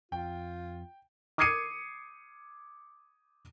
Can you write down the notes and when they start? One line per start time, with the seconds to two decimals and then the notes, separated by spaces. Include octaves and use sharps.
0.12 F2 F4 G5
1.38 D6 D#6 G#6 C7 C#7 D#7